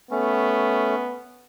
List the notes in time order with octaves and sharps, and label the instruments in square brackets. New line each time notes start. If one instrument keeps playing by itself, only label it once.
[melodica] A3 C#4 [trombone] B3